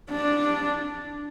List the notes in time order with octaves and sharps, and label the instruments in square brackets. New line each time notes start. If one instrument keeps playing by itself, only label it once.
[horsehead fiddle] D4